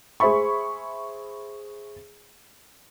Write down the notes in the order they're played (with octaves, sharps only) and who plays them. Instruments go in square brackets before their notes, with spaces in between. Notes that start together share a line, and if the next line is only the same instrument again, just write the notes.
[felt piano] G#4 C5 E5 B5 C#6